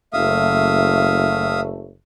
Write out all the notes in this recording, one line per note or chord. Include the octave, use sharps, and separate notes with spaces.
F#1 A3 E5 F5 D#6